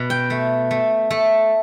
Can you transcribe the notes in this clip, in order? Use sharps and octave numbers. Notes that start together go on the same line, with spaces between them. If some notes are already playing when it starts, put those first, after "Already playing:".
Already playing: B2
G5
A3
A3
A3